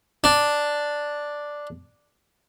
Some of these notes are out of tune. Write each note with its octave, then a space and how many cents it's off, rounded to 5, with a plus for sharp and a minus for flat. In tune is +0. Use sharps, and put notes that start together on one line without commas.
D4 +0